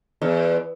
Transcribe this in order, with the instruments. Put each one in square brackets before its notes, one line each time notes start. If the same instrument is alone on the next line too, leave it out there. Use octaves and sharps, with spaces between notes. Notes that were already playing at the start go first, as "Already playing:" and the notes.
[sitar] E2